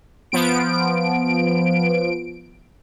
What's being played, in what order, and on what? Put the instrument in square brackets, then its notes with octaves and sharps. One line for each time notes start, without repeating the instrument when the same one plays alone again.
[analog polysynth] F3 B3 D7